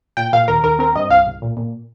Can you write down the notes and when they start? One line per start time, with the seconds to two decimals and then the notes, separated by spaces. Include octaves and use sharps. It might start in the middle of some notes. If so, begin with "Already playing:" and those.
0.17 A#2 G5
0.33 A#2 F5
0.48 D#2 A#4
0.63 D#2 A#4
0.79 C4 A#4
0.95 G2 D#5
1.10 C2 F5
1.27 C2
1.42 A#2
1.57 A#2